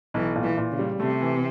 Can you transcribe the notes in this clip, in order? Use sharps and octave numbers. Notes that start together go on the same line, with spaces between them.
B1 E3
A#2
E3
A#2
C#3
G3
C3 A3
E3